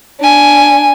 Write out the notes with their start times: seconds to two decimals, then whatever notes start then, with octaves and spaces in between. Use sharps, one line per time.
0.20 D4 G#5